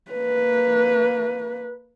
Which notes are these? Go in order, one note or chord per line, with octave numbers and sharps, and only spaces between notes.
A#3 B4